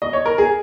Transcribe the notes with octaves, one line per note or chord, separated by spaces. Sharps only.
D#5
C#5
A#4
G#4